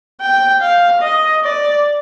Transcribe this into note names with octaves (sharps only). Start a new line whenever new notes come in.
G5
F5
D#5
D5